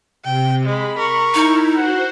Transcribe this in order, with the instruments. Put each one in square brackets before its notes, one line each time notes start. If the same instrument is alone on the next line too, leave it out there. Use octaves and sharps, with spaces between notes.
[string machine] C3 [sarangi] G5
[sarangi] G#3 [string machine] B5
[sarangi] A#4 [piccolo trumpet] C#6
[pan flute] D#4 [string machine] E4
[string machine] F#4 C5 [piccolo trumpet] F#5